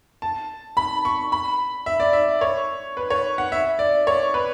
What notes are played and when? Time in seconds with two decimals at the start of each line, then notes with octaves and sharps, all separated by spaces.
0.22 A5
0.77 B5
1.05 C#6
1.32 B5
1.86 E5
2.00 D5
2.13 E5
2.41 C#5
2.97 B4
3.10 C#5
3.38 F#5
3.52 E5
3.79 D5
4.07 C#5
4.34 B4